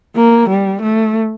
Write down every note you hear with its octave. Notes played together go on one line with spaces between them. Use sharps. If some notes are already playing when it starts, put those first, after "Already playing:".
A#3
G3
A3